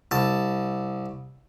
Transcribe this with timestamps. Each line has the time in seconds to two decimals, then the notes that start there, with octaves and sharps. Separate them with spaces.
0.11 C2 A5